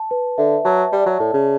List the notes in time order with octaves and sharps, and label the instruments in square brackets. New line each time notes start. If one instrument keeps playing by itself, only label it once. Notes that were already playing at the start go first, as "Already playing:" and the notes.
Already playing: [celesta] A5
B4
[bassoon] D3 [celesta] E5
[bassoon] F#3 [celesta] A5
[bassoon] G3 [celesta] D5
[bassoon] F#3
[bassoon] A2 [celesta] A5
[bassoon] C#3